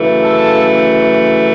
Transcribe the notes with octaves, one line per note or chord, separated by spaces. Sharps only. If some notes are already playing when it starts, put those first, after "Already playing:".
Already playing: F#2 C#3 E3 A3
A4